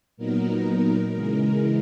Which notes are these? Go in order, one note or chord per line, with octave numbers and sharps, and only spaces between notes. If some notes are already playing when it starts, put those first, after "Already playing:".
A#2 F#3 B3 D#4 A#4
A#4
C#3 E3 G#3